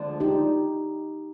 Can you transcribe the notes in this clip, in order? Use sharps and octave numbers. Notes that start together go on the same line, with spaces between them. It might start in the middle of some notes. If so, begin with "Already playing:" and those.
Already playing: D2 D3 F3 G#3 D4
D#4 G4